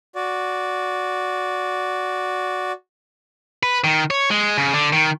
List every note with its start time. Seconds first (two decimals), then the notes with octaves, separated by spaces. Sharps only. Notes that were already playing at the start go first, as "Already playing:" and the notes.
0.16 F#4 D5
3.63 B4
3.84 D#3
4.10 C#5
4.30 G#3
4.58 C#3
4.74 D3
4.93 D#3